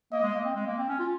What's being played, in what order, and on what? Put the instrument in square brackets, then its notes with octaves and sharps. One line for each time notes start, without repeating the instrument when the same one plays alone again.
[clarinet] A#3 [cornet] D#5
[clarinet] G#3
A#3
C4
G#3
A#3
C4
C#4
F4